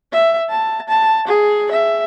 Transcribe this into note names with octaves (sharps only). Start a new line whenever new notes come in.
E5
A5
A5
G#4
E5